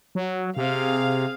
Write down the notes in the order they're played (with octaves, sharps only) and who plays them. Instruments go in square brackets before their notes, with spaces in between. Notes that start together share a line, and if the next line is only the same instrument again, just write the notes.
[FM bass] F#3
[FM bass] C3 [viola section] C4 G#4 F5